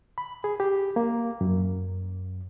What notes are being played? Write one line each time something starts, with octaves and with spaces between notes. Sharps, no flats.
B5
G#4
G4
A#3
F#2